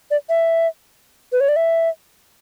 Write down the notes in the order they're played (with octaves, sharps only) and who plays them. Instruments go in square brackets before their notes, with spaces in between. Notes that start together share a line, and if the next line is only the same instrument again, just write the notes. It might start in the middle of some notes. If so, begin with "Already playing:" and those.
[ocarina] D5
E5
B4
C#5
D5
E5